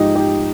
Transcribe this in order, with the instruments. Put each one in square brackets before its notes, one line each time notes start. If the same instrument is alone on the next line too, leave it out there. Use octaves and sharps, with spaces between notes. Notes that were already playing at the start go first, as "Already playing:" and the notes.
Already playing: [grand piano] G#2 F3 D#4 G4
D#4 G4